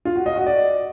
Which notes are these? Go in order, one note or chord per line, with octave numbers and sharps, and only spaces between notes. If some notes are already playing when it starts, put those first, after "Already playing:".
F4
F#4
D#5
F#4
D5